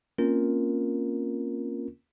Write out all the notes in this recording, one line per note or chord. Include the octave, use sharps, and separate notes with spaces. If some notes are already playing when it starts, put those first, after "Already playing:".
A#3 C4 C#4 F4 A#4